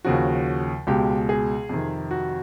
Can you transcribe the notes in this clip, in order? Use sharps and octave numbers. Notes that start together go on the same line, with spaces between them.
D#2 C#3 F3 F#4
C#2 B2 G#3 G4
G#4
F2 C3 D#3
F#4